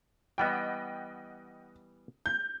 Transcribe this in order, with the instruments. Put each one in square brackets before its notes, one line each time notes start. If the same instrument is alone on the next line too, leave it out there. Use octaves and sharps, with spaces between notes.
[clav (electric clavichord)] E3 G3 B3 [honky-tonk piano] D#5 F#5 G5
[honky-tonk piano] G6